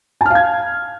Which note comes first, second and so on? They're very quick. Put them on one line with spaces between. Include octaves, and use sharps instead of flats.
A5 F6 F5 G#6